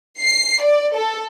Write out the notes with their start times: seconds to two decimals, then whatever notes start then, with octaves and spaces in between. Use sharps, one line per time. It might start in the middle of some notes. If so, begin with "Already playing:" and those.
0.20 C7
0.61 D5
0.95 A4